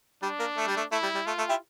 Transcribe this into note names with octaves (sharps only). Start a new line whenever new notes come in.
G3 D4
A#3
A3
G3
A3
A3 E4
G3
G3
A3 F4
A3
E4 G4